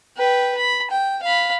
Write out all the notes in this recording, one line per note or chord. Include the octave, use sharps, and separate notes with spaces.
B4 G5
B5
G5
F5 B5